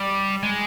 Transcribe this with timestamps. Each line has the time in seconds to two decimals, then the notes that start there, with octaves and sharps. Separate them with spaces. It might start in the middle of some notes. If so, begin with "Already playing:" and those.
Already playing: G3
0.43 G#3